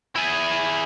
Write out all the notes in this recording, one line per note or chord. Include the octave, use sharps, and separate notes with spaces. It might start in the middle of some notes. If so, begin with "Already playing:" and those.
E4 G#4